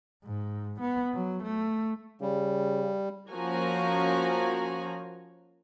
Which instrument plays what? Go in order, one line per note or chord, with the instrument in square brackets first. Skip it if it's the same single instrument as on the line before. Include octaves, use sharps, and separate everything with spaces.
[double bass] G#2
B3
F#3
A3
[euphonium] C#3 [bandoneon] G3
[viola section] F3 A#3 C#4 F#4 G#5 A#5